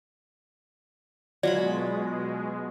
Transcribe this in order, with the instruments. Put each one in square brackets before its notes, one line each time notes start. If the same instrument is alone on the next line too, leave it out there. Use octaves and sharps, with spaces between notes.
[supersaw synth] B2 G#3 [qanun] F#3 F4 B5 [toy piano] D5